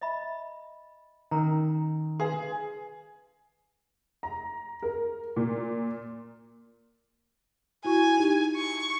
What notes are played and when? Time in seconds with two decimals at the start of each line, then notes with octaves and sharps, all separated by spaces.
0.01 D#5 E5 B5
1.31 D#3 C#4 A#4 A#5
2.20 G#4 B4 F5 C6
4.23 A#5
4.83 A#4
5.36 A#2
7.85 E4 F#4 G#5 C#6
8.17 D#4 G4
8.56 C#6